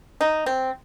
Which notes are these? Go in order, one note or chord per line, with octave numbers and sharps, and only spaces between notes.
D#4
C4